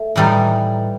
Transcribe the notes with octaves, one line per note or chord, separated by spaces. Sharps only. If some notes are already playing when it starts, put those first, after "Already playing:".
Already playing: A3
A2 E3 G3 D#4